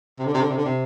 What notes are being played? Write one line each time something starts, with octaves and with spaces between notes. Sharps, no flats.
C3
D3
C3
D3
C3
D3
C3